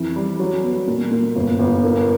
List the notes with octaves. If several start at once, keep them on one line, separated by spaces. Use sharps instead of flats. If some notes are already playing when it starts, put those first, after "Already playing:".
Already playing: F2 E3
G3
F#3
B3
A#2
A#2
G1
G1
A#3